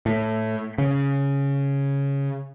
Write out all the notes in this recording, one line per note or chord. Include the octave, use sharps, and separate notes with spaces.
A2
C#3